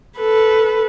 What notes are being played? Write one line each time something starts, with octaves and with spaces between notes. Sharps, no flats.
A4 B4